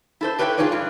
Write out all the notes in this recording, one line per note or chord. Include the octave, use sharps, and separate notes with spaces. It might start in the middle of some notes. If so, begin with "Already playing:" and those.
E4 A4 C5
G4 B4 C#5 E5 G5
F4 G4 G#4 B4 C#5 D5
G2